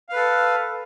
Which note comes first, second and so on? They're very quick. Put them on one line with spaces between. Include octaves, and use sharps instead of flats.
F5 B4 A4